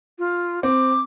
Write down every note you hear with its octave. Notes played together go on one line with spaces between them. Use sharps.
F4
C4 D6